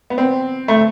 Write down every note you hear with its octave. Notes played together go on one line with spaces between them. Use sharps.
B3
C4
A3